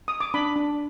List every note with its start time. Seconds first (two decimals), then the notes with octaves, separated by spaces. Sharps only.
0.08 D#6
0.20 D6
0.34 D4 B5
0.56 D4